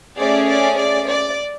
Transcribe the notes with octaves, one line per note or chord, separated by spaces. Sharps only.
A3 C#4 G#4 D5
D5
D5
D5